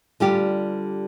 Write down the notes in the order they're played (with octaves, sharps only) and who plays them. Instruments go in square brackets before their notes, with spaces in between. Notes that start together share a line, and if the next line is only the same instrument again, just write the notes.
[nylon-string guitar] D3 G3 F4 G4